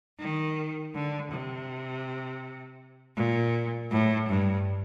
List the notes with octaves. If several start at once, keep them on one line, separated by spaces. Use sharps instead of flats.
D#3
D3
C3
A#2
A2
G2